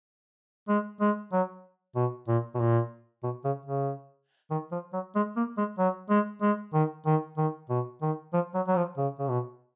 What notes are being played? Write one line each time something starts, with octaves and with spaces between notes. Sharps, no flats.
G#3
G#3
F#3
B2
A#2
B2
A#2
B2
C#3
C#3
D#3
F3
F#3
G#3
A#3
G#3
F#3
G#3
G#3
D#3
D#3
D#3
B2
D#3
F3
F#3
F#3
F3
C#3
C#3
B2